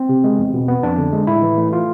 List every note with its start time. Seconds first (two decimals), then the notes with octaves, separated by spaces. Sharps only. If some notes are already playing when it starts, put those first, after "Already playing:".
Already playing: C4
0.09 C3
0.24 G#3
0.39 E2
0.54 B2
0.68 B3
0.83 F2 D4
0.98 D3
1.13 G#3
1.27 A2 E4
1.42 E3
1.57 A3
1.73 F4